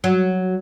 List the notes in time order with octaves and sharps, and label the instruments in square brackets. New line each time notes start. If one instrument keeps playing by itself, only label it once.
[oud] F#3